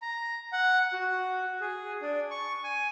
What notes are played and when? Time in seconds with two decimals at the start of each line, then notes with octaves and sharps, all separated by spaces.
0.02 A#5
0.52 F#5
0.93 F#4
1.61 G#4
2.02 D4
2.31 C#6
2.64 G#5